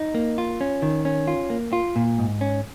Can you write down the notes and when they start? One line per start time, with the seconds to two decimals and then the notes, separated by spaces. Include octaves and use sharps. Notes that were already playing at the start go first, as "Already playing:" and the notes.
Already playing: D#4
0.15 A#3
0.38 F4
0.61 C#4
0.82 D#3
1.05 C#4
1.28 F4
1.50 A#3
1.73 F4
1.96 A#2
2.18 G#2
2.41 C#4